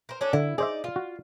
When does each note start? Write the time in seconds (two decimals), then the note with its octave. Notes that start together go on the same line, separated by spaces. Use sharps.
0.09 A#4 C5
0.21 C#4 D4 A4
0.33 D3 E4
0.58 D#4 G#4 C5 D5 E5
0.84 F4
0.96 F#4